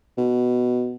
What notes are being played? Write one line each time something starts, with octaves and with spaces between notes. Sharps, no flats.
B2